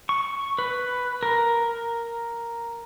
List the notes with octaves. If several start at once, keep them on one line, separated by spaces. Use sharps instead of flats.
C#6
B4
A#4